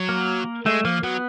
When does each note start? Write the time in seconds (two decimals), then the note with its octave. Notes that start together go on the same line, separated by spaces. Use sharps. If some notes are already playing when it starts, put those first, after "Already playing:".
Already playing: F#3
0.09 A#3
0.66 G#3 A3
0.85 F3 A#3
1.04 F#3 B3